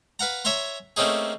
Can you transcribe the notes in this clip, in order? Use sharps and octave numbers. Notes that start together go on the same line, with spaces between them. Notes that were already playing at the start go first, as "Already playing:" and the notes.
B4 F5 F#5 A#5
C#5 E5 G#5 A#5 C6
A3 A#3 C4 C#4 D#4 G#4